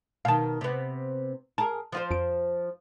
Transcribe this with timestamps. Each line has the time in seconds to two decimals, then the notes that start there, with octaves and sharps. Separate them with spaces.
0.25 B2 D#3 F5 A5
0.61 C3 B3
1.58 G#4 A#4 A5
1.92 F3 F4 C5
2.11 F2 D7